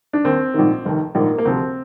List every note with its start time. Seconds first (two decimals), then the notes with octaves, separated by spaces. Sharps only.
0.13 D4
0.24 D#2 D#3 C4
0.54 A#1 G#2 D#3
0.85 F1 D#2 D#3
1.15 A#1 G#2 D#3 A#3
1.38 A#3
1.45 D2 C3 F3 C4